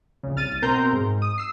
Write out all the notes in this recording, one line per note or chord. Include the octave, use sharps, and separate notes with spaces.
A#1 C#3
C2 F6 A6 D#7
B2 C4 A#4 A#5 C6 G6
G#2
D#6
E6 C7